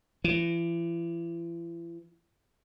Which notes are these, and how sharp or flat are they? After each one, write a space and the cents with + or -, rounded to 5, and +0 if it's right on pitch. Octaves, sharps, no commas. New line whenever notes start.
E3 +40